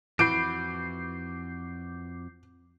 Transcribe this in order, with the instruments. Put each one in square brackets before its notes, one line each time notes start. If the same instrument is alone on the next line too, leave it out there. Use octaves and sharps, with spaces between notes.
[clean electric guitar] F2 F#4 B5 [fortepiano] E3 [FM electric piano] D6 G6 C7 [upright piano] D7